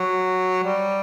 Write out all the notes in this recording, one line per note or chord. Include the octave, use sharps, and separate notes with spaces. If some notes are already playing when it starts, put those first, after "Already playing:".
Already playing: F#3
G3